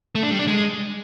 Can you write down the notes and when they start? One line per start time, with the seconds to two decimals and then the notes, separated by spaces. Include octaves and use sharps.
0.15 A3
0.23 D4
0.31 G3
0.39 D4
0.47 G#3